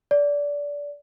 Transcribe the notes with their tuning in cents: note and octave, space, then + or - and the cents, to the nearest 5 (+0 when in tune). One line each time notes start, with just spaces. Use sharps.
D5 -20